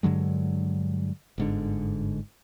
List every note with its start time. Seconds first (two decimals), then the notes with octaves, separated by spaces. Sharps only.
0.03 G2 D3 F#3 G#3
1.38 G1 G#2 D3